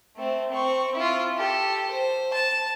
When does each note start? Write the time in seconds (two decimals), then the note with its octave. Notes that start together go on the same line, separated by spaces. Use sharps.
0.16 A3 C4
0.51 C4 C#6
0.95 E4 F4
1.38 G4 A4
1.91 C5
2.34 A5